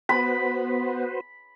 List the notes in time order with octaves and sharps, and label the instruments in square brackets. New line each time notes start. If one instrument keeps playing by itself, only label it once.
[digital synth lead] B3 [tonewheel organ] F#4 B4 C5 [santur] B5